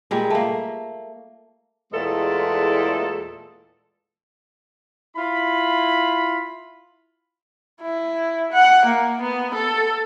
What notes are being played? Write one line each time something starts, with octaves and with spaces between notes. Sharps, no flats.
A#2 G3 G#3
A3 A#3
E2 A#2 G#3 A3 E4 A4
E4 F4 B5
E4
F#5
A#3
B3
A4